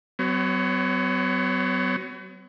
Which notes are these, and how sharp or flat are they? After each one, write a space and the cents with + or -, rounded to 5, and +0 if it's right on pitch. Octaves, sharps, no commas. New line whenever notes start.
F#3 +30 B3 +45 C#5 +0